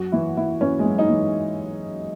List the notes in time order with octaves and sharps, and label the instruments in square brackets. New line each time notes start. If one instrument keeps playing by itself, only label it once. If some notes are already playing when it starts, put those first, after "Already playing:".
Already playing: [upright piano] F#2 F#4
E3 E4
E3 E4
E3 C#4
G#3
F#2
D#4
E3